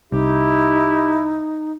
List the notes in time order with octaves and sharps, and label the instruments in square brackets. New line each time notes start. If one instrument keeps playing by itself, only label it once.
[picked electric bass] C2 [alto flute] D#4 [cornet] E4 [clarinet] G4